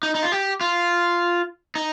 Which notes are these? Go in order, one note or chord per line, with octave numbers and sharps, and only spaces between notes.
D#4
D#4
F4
G4
F4
D#4